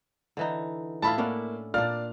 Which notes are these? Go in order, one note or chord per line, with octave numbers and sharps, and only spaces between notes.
D3 E3 D#4
A2 E4 F4 A5 B5
A#3 C#4 D4 F#5
A#2 D4 D5 F5 F6